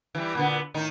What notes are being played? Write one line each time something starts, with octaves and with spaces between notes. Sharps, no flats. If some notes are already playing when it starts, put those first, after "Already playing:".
E3 G3
A#2 D3 B3
A2 D#3 D#4